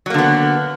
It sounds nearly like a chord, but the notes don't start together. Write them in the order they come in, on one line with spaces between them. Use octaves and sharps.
F#3 A#3 D3 B3